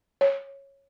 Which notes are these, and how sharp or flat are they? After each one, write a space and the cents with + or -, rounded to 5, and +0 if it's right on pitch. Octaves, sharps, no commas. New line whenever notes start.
C#5 -10